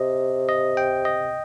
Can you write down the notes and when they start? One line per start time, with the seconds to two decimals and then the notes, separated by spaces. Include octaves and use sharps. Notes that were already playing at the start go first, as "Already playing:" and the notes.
Already playing: C3 D#5
0.49 D#5
0.77 G5
1.05 D#5